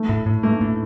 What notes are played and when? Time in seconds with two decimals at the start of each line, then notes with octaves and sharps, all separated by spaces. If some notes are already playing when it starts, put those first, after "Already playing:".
Already playing: A3
0.09 A2
0.26 A2
0.43 A3 A#3
0.61 A2